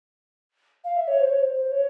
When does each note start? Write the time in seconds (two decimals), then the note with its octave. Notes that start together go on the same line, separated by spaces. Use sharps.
0.84 F5
0.96 E5
1.08 C#5
1.20 C5
1.30 C#5
1.40 C5
1.54 C5
1.71 C#5